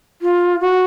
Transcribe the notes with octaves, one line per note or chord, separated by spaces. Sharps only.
F4
F#4